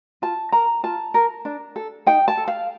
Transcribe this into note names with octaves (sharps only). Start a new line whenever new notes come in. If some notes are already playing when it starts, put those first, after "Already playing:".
F4 A5
A#4 A#5
F4 A5
A#4
D4
A4
D#4 G5
A5
A4
F5